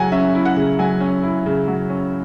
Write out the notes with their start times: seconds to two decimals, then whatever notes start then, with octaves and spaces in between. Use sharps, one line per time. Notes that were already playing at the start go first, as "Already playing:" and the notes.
Already playing: C#3 F#3 F#5 G#5 A#5
0.12 C#4 E5
0.35 E4
0.45 F#5
0.57 C#3
0.79 F#3 G#5
1.00 C#4
1.23 E4
1.46 C#3
1.68 F#3
1.90 C#4